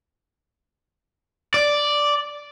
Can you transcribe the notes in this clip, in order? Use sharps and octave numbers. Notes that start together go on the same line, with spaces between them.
D5